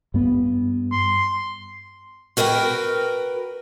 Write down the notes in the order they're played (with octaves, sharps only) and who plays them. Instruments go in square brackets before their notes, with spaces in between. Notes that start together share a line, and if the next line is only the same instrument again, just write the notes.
[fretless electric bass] G2 B3
[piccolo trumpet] C6
[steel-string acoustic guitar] F#4 A#4 B4 D#5 G5